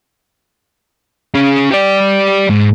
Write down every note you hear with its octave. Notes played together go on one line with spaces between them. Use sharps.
C#4 G#4
G4 D5
G#2